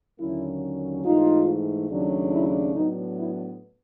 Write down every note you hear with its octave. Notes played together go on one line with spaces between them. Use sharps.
D#2 D3 F#3 A#3 C#4 E4
G#2 E3 A3 D#4 F4
D#2 C#3 F#3 A3 D4
E4
A2 F#3 B3 D4 D#4
E4